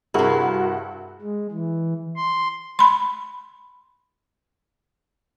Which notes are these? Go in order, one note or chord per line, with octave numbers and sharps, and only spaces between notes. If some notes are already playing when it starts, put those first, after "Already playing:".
G2 C3 E4 F#4 G#4 A#4 F#5
G#3
E3
C6
B5 C6